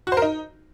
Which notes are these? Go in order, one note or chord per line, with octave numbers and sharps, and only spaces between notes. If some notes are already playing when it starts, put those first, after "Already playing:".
F#4
C5
A#4
D#4